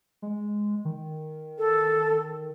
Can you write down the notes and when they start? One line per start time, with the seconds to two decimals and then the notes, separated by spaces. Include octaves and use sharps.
0.22 G#3
0.85 D#3
1.58 A4